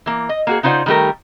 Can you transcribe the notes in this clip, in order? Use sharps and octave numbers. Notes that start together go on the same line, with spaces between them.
E3 A#3
D#5
A#3 F#4 G#4
C#3 D#4 F4 C5 D5 F#5
D#3 G3 A3 G4 A#4